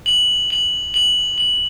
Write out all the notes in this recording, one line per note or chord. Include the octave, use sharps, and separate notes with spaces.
F#7
F#7
F#7
F#7